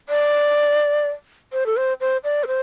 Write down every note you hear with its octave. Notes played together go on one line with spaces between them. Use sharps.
D5
C5
A4
C5
C5
D5
A4
C5